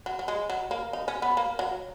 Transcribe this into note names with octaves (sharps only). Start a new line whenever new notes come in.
F#3
F#3
G#3
F#3
A#3
D#4
C#4
B3
A#3
F#3